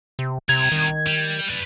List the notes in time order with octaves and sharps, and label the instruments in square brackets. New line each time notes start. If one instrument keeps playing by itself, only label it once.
[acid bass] C3
[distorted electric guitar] C2 A#5 [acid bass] C3 [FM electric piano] G#6
[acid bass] D#3
[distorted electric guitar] G3
B4 D5